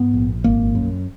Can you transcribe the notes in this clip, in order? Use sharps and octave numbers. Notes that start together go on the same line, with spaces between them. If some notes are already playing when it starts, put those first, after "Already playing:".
Already playing: G#2 B3
A#1
G#1 A#3
F#2